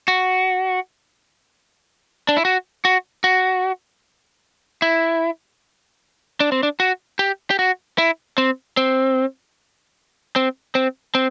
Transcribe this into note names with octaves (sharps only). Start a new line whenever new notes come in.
F#4
D4
E4
F#4
F#4
F#4
E4
D4
C4
D4
F#4
G4
G4
F#4
E4
C4
C4
C4
C4
C4